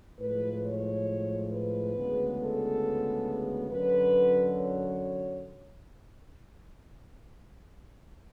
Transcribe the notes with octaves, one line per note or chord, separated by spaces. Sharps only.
A2 F3 G#3 B4
C#5
B4
D2 C#3 G#3 B3
A4
F#2 D3 F#3 B4
C#5